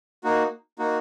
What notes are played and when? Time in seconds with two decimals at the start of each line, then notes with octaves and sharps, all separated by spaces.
0.24 A#3 D#4 F#4
0.79 A#3 D#4 F#4